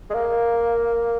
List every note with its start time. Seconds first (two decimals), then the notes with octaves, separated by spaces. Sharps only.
0.10 G#3
0.14 A#3